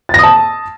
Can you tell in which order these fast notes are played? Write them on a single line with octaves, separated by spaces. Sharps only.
A6 A#6 D#6 A5